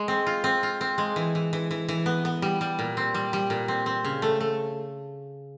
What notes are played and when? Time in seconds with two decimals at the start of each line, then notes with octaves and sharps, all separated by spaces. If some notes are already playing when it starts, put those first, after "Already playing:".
Already playing: G#3
0.08 C4
0.27 F4
0.44 C4
0.63 F4
0.81 C4
0.98 G#3
1.16 E3
1.35 E3
1.53 E3
1.71 E3
1.89 E3
2.06 B3
2.25 B3
2.42 G3
2.61 G3
2.79 A#2
2.97 C4
3.14 G3
3.33 G3
3.50 A#2
3.68 C4
3.86 C4
4.04 C#3
4.22 A3
4.40 A3